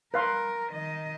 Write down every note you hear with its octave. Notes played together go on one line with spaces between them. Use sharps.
A#4 B4 F5 C6
D#3 D#5